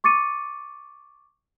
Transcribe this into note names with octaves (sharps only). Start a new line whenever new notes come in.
C#6 D6 A6 C#7 D#7